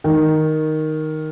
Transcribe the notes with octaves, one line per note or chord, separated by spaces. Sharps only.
D#3